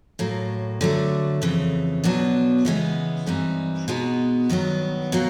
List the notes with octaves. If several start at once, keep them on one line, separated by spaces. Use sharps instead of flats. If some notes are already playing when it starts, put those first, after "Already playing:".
A2 F#3 A#3
D3 F#3 A3
F2 C#3 E3
B2 F#3 B3 D4
C#3 E3 G#3 B3
G2 E3 G3 C4 D#4
B2 G#3 B3 D#4 F#4
G2 D#3 F#3 B3
B2 F#3 A#3